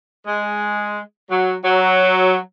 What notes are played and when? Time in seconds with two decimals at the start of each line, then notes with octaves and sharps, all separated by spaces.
0.26 G#3
1.30 F#3
1.64 F#3